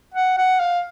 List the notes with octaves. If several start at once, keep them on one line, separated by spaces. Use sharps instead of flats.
F#5
F#5
F5